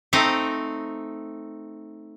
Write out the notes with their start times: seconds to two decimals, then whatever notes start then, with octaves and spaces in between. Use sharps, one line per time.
0.13 A3 C4 D#4 A#5